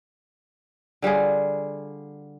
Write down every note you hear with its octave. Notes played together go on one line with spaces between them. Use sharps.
D3 G3 F4 G#4